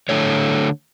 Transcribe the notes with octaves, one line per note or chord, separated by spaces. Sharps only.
D3 A3 C#5